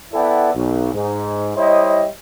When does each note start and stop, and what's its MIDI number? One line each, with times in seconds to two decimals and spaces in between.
0.14 0.50 59
0.14 0.50 64
0.14 0.50 69
0.14 0.50 74
0.14 0.50 78
0.14 0.50 79
0.55 0.89 35
0.94 1.52 44
1.57 2.05 55
1.57 2.05 64
1.57 2.05 72
1.57 2.05 73
1.57 2.05 75